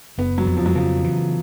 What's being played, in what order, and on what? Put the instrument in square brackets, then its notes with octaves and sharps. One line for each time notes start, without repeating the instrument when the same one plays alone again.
[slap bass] F#1 [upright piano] B3
[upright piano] F#3
[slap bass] F2
[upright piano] F3
F#3
[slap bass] C#3 [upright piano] F3
[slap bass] E3